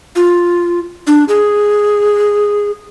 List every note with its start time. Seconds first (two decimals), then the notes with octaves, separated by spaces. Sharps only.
0.16 F4
1.07 D4
1.28 G#4